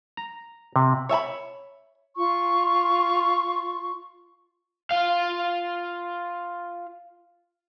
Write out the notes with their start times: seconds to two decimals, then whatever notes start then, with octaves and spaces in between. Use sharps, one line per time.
0.17 A#5
0.76 C3
1.09 C#5 E5 G#5 B5
2.16 F4 C#6
4.91 F4 F5